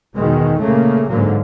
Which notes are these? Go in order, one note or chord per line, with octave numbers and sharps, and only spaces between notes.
E2 B2 D#3 G#3
A#2 C#3 A3 A#3
G#2 D3 F#3 A#3